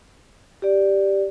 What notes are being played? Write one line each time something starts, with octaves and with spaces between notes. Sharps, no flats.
G4 D5